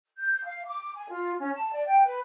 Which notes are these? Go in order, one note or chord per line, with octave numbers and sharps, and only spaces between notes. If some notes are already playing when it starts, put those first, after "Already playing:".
G6
F5
D6
G#5
F4
C#4
A5
D5
G5
B4